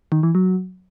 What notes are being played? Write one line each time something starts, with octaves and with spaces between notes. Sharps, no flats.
D#3
E3
F#3